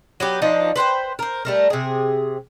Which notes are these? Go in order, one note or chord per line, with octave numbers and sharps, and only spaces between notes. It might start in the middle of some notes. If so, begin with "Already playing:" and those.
F#3 B3 G4
F3 D4 D#4
B4 C5 F#5 G5
A#4 C5
G3 A3 A#4
C3 G#4